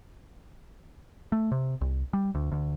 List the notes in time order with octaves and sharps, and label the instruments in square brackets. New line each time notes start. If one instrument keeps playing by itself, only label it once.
[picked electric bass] A3
C3
C2
G3
D2
D2